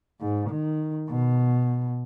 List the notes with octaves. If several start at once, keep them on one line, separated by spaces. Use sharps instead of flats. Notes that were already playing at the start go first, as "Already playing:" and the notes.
G#2
D#3
B2